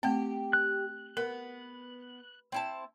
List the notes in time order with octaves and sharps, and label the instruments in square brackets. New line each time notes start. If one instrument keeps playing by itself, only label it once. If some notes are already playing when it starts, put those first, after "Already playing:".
[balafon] A3 C4 [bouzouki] G4
[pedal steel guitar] F#6
[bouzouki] B3 [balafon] A#4
[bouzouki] C4 E4 A5